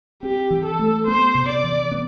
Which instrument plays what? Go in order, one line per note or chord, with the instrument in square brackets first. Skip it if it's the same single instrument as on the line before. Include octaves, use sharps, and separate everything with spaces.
[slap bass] C4 [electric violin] G4
[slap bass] E3
[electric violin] A4
[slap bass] A3
[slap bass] B3 [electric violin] C5
[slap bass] C3
[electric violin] D5
[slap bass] E3
B3